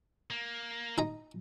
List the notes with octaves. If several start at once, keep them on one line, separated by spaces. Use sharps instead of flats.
A#3
D#4 A#5